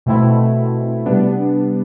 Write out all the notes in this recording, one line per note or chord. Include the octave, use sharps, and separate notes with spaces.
B2 A3 C4 E4
C3 G3 B3 D4